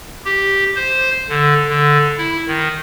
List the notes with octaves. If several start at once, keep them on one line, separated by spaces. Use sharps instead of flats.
G4
C5
D3
D3
E4
D#3